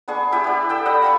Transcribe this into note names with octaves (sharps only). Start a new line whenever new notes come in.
B3 D4 G#4 C#6
B3 E4 G4 E5
G4 D5
A4 G5 E6
G3 D#5 F#5
F5 B5 C#6